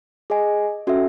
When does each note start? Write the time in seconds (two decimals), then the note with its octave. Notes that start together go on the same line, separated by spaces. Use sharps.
0.30 G#4 D#5 G#5
0.87 C#4 F#4 A4 E5